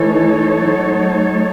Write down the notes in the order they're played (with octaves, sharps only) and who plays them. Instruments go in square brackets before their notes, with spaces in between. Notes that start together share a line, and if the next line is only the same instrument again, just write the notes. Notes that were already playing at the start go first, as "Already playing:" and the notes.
Already playing: [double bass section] E3 [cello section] A3 D#4 A4 C#5
[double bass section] F#3